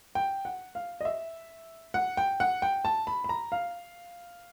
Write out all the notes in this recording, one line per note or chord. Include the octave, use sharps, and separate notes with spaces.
G5
F#5
F5
D#5
E5
F#5
G5
F#5
G5
A5
B5
B5
A#5
F5